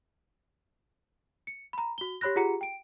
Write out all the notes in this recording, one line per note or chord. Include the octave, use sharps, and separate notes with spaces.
C#7
A#5 B5
F#4 G7
G4 C#5 B5 F#6 A#6
F4 G4 G#4 F#5 A#5 C#7
G5 D7